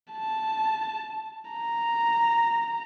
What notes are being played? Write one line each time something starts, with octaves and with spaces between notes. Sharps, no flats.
A5
A#5